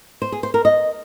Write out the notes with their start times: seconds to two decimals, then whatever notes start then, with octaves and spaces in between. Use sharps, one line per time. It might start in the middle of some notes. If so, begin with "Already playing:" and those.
0.22 C5
0.32 G#4
0.43 C5
0.54 A#4
0.65 D#5